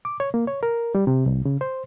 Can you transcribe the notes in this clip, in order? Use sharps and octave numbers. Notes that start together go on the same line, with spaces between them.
D6
C#5
A#3
C#5
A#4
G3
C3
C2
C#3
C5